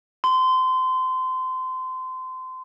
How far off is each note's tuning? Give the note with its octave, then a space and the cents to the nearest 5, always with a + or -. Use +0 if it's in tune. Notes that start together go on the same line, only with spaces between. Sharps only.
C6 -25